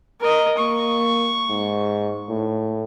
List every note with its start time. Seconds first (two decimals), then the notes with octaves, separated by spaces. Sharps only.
0.20 A#4 D#5
0.58 A#3 C#6
1.50 G#2
2.29 A2